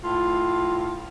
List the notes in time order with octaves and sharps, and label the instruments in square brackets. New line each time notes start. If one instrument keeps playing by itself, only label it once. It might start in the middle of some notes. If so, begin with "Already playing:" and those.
[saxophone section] A2 F4